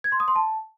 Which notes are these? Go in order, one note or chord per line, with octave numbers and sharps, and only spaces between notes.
G#6
C6
D#6
C6
A5